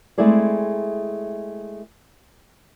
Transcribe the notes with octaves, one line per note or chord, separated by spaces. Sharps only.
G#3 A3 C4 E4 G#4 D5